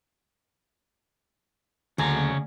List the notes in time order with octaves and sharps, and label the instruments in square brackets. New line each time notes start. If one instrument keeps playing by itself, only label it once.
[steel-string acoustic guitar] D2 [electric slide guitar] C#3 G#5 A#5